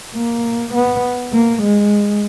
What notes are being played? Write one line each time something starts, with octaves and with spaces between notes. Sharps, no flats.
A#3
B3
A#3
G#3